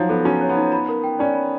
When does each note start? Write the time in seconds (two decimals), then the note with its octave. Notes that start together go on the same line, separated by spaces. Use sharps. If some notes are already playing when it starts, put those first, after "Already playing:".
Already playing: F3 F#3 D#4 C#5
0.09 B3 A4
0.24 C#4 F#4
0.41 C#5
0.49 B3
0.57 D#4
0.72 B5
0.89 A#4
1.04 G5
1.19 C#4 D5
1.35 B5